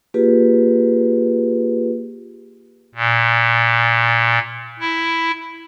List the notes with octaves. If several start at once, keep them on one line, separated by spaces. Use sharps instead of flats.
A#3 F4 G4 G#4 B4
A#2
E4